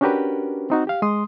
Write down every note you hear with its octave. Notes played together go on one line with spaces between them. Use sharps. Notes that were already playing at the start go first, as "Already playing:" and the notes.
C#4 D4 F#4 G4 A#4 B4
C4 D#4 F#4
G4 F5
G#3 C6 D#6